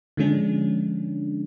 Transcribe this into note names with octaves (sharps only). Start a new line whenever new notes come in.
D3 F3 G#3 C#4 D4